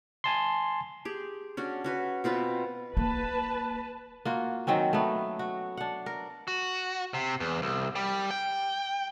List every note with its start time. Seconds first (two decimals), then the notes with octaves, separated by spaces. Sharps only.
0.24 G#5 A5 C6
1.05 G4 G#4
1.57 C#4 D4 F#4
1.84 C#4 F#4 B4
2.24 B2 C4 F4 B4
2.97 A#3 B4 A5
4.25 A#3 F4 F#4
4.67 D#3 F#3 C4 C#4
4.93 A3 B3
5.39 F#4
5.77 D4 F#5
6.06 A#4
6.48 F#4
7.14 C3
7.40 E2
7.62 C2
7.95 G3
8.31 G5